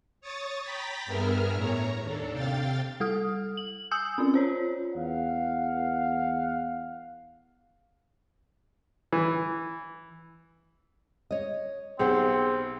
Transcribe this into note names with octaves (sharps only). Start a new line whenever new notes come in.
C#5 C#6 D#6 A6
G5 A#5 B5 A6 B6
G2 B3 G#4 A#4 E5 F6
A2 C#5 A#5
D#2 D4 A4
C3 F5 G5 A6
G3 A4 D#6 F6
F#7
G#5 D#6 E6 G6
C4 C#4 F4
F4 C5 C#5
E2 F5 F#5
E3
C#5 D#5
B1 C4 G4 G#4 C5 F#5